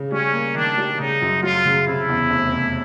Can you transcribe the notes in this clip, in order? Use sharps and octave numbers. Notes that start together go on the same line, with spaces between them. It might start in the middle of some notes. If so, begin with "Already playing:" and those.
Already playing: C#3
G3 C#4
A#3
D#3 D4
G3
C#3 D#4
F#2
F#3 F4
C#3
C3 E4
E2
F1
F1